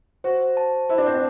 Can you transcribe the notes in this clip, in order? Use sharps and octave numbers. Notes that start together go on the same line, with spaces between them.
F#4 C5
A5
E4 C5
D4
C4
D4